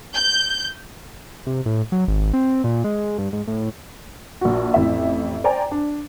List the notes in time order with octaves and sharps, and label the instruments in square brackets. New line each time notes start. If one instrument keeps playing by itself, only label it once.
[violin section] G6
[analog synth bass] C3
A2
F#3
G#1
C4
A#2
G#3
G2
G#2
A2
[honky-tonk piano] A#1 F#4
A1 F2 E4 E5
C5 D5 G5 G#5 A#5
D4